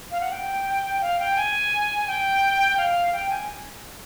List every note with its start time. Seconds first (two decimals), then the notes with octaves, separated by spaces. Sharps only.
0.11 F5
0.20 F#5
0.31 G5
1.01 F5
1.19 G5
1.36 G#5
2.07 G5
2.77 F5
3.13 G5
3.30 G#5